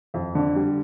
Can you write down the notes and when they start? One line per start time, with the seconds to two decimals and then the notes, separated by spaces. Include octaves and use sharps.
0.14 F2
0.35 D3
0.56 G3